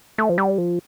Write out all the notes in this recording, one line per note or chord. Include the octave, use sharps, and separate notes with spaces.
A3
F3
G3
F3